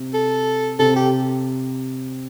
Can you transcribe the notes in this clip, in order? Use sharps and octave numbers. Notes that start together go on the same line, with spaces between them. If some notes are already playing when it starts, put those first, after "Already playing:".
Already playing: C3
A4
C3 A4
G4